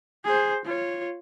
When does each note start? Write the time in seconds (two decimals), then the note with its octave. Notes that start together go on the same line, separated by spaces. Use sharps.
0.25 G#4 C5
0.65 F4 C#5